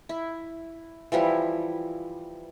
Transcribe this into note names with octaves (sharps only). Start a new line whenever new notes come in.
E4
E3 F3 G3 E4